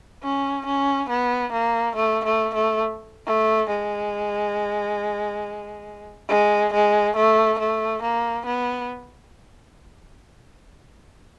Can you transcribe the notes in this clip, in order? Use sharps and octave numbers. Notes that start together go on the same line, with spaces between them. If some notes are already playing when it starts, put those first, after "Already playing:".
C#4
C#4
B3
A#3
A3
A3
A3
A3
G#3
G#3
G#3
A3
A3
A#3
B3